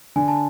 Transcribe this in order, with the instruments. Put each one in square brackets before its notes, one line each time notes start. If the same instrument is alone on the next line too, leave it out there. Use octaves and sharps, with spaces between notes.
[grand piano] D3 [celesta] G#5
[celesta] A5